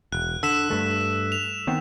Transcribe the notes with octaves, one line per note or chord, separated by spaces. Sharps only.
E1 F#6
D3 E6 B6 E7
G2 A3
F7
D#3 B3 C4